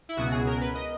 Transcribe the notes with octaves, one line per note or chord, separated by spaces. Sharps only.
E4
C#2 B2 F#3 B3 F#4
G#4
A#4
B4
D#5